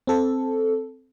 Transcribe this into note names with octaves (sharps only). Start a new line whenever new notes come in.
C4 A4